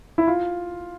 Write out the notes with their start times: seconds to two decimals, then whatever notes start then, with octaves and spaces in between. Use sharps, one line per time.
0.18 E4
0.27 F4